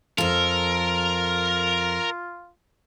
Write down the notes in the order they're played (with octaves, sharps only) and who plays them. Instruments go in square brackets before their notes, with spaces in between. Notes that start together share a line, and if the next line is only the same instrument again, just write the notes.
[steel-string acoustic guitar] F2 A4 [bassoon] F4 [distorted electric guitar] A#4